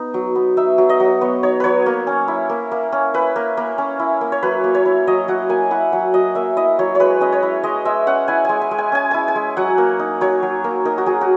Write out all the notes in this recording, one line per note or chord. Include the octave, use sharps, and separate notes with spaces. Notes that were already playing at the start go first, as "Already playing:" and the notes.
Already playing: B3 D#4
F#3
B3
D#4 E5
F#3
D#5
F#3
B3 C#5
D#4 C#5
F#3 B4 C#5
A#3
C#4
E4
A#3
A#3
C#4
E4 B4
A#3
A#3
C#4
E4
A#3
C#5
F#3 B4
A#3
C#5
E4
F#3 D#5
F#3 F#5
A#3 G#5
E4 F#5
F#3 F#5
F#3 D#5
A#3 E5
E4 D#5
F#3 C#5
G#3 B4 C#5
C#4 D#5
C#5
E4
G#3 D#5
G#3 E5
C#4 F#5
E4 G#5
G#3 G#5
G#5
G#3
G#5
C#4 G#5
E4 G#5
G#5
G#3
F#3 F#5
A#3
D#4
F#3 C#5
F#3
A#3
D#4 A#4
F#4
F#3 G#4
F#4